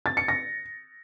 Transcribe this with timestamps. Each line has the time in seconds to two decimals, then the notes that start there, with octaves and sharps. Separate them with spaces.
0.06 A6
0.17 C#7
0.28 A#6